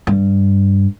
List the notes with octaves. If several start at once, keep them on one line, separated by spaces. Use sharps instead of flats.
G2